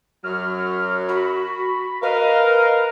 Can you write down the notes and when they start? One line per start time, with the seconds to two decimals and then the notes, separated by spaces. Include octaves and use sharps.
0.24 F#2 F#3 F6
1.09 F#4 B5
2.03 A#4 B4 D#5 F5